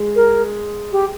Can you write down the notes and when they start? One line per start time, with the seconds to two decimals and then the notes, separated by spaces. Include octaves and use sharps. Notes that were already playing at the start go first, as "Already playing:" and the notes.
Already playing: G#3
0.16 A#4
0.92 G4